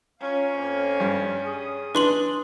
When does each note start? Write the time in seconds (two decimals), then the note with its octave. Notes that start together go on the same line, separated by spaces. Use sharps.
0.20 C#4 F4 A#4 F5
0.53 F2 A#3
1.00 G2
1.45 G#4 D#6
1.95 D4 B4 C6 F#7